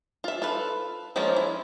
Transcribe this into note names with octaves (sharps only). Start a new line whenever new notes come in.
F4 E5
F4 A4 B4
F3 G#3 A#3 C#4 F4
E4